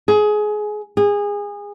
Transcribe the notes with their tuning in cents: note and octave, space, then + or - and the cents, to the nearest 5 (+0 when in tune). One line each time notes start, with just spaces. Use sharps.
G#4 +20
G#4 -25